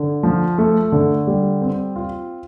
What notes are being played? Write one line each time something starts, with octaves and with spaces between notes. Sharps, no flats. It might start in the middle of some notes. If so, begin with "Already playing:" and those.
Already playing: D3
F3
A3
D3
G3
C4
F4